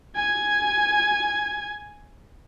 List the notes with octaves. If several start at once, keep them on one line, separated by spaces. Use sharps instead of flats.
G#5 G#6